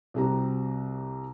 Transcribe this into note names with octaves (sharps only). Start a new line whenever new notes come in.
C2 C4 F#4 G4 A#5